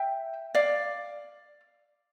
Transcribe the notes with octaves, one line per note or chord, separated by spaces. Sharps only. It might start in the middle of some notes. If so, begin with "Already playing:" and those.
Already playing: E5 G5
D5 F5